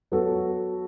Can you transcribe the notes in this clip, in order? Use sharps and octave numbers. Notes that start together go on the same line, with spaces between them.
F#3 B3 F#4 A4